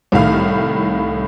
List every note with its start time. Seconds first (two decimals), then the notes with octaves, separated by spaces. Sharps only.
0.12 C2 A2 D#3 F5 F6